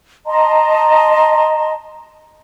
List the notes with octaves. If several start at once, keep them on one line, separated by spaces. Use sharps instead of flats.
D#5 A5 A#5 C6